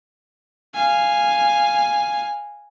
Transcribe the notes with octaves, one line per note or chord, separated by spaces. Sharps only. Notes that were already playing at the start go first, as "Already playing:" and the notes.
F5 G#5